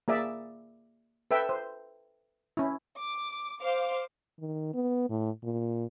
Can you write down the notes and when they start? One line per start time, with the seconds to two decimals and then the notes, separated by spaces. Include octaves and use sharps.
0.08 A#3 G#4 D5 E5
1.31 A4 B4 E5 G5
1.49 C5
2.57 C#4 E4
2.99 D6
3.61 C5 F5 D6
4.40 D#3
4.74 B3
5.09 A2
5.44 A#2